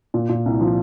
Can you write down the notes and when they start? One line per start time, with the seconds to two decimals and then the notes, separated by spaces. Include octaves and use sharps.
0.14 A#2
0.29 A#2
0.46 C2
0.61 F3